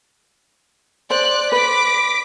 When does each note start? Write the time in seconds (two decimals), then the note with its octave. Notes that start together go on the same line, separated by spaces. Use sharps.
1.10 C5 D5 F#6
1.52 B4 D6 B6